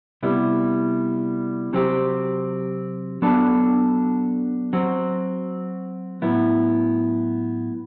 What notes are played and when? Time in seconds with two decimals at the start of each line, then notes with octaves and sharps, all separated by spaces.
0.23 C3 G3 B3 E4
1.73 C3 F#3 C4 G4
3.22 F#3 B3 D4 F#4 A4
4.73 F#3 C4 F#4
6.22 A2 F#3 B3 E4